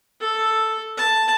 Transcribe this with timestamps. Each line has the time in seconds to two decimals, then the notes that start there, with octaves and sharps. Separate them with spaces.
0.20 A4
0.97 A5